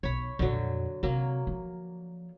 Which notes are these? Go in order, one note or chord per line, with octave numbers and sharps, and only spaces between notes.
B1 C#5 B5
F2 A#2 D3 F#3
C3 F#3 A#3
F3